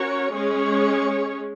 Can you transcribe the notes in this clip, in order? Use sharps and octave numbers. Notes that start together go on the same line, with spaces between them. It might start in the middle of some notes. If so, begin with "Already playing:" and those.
Already playing: C#4 F#4 A#4 C#5
G#3 C#4 G#4 C#5